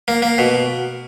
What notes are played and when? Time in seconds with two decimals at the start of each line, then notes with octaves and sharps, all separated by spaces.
0.08 A#3
0.22 A#3
0.38 B2